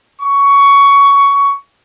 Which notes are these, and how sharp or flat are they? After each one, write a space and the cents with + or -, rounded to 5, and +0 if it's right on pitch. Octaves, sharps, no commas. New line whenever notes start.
C#6 +15